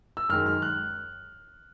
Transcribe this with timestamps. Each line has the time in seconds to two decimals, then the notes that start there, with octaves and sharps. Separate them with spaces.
0.17 E6
0.29 F#2 D#3 G#3 F6
0.46 F6
0.62 F#6